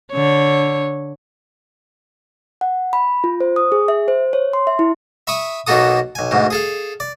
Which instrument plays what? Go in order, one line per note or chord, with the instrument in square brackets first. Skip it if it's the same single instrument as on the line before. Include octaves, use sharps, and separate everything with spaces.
[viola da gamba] D3 C#5
[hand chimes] F#5
B5
F4
C5
D#6
G#4
E5
C5
C#5
C6
E5
E4
[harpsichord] E5 B5 C#6 D#6
B1 B2 A#3 F#4 A4 D#6
B1 G#5
D2 G#2 B2
G#4 A4 F5
D5